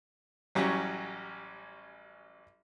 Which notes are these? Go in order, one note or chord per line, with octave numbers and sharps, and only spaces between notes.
A1 F#3 G3 C#4